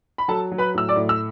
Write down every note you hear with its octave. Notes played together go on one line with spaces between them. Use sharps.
B5
F#3 A4 A5
F#3
B4 B5
A2 E6
D5 D6
A2
E6